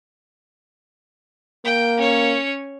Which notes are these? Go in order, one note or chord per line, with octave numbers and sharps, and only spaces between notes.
A#3 G5
C#4 C#5